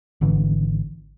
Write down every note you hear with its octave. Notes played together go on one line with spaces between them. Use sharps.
G#1 D3 E3